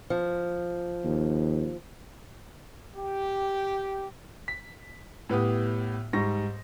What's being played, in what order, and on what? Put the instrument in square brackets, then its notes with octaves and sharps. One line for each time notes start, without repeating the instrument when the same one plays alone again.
[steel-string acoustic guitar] F3
[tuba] D#2
[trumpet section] G4
[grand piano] B6
A2 B3 G4 D#6
G#2 G3 C#6 A#6